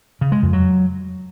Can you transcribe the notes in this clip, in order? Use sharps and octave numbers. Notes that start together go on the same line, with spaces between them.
C#3
G#3
F2
F#3